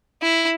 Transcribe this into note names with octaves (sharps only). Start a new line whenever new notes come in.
E4